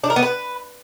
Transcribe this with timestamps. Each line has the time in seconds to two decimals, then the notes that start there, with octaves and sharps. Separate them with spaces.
0.04 D4
0.10 A#4
0.16 B3
0.23 B4